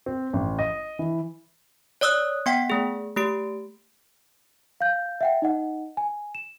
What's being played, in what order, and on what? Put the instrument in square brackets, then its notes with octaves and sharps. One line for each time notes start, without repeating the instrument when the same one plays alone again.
[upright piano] C4
A1
D#5
E3
[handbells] C#5 D5 D#6 E6 F#6
B3 F#5 G5 B6
A3 G#4
A3 G4 D7
[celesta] F5 G6
E5 F#5 G5
D#4 D#5 F#5
G#5
E7